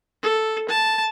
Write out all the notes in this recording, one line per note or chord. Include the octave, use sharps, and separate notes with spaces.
A4
A5